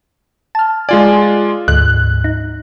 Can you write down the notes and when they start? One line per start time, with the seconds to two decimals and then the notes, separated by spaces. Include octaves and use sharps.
0.55 A5 F6
0.89 G#3 F4 D5 G#5
1.68 D2 G#2 F#6
2.24 D#4